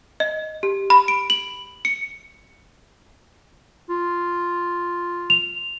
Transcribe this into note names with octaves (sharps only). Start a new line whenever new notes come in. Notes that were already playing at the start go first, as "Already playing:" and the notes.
D#5
G4
B5
D7
F#7
C#7
F4
F7